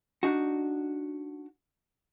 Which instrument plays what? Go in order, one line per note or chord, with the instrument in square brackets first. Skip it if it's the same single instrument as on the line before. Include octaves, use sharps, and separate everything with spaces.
[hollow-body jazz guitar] D4 D#4 F#4